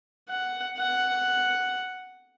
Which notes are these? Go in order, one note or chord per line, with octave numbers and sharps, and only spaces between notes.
F#5
F#5